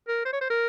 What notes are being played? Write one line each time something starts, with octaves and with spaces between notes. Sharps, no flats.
A#4
C5
C#5
C5
A#4